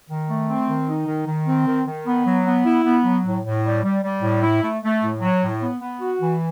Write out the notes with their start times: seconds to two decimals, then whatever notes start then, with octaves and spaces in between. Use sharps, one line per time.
0.09 D#3
0.29 A3
0.48 C4
0.68 D#3
0.88 D#4
1.07 D#3
1.27 D#3
1.46 C4
1.67 D#3
1.87 D#3
2.06 B3
2.26 F#3
2.46 B3
2.65 E4
2.84 B3
3.04 F#3
3.25 A2
3.44 A2
3.64 G3
3.84 G3
4.03 G3
4.22 A2
4.42 E4
4.63 A3
4.83 A3
5.02 A2
5.21 F#3
5.42 A2
5.61 B3
5.81 B3
6.00 F#4
6.20 E3